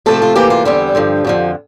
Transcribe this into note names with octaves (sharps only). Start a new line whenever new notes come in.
C3 F3 A3 C4 A4
F4
C3 E3 A#3 G4
F4
E2 D3 G3 C4 G4
G2 D3 F3
F2 D3 F3